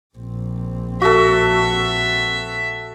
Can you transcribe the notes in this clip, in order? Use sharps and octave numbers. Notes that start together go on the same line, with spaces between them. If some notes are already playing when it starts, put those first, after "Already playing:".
A#1 C4
F#4 A4 E5